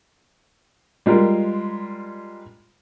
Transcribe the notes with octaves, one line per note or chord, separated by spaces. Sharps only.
G3 G#3 F4 A#4